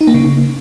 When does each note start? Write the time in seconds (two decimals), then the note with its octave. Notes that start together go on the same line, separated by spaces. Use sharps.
0.01 D#4
0.07 A#3
0.14 C#3